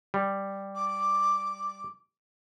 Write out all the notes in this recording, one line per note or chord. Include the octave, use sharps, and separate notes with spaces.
G3
D6